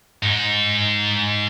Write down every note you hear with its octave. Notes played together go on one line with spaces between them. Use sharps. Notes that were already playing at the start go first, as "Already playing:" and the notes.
G#2 D#4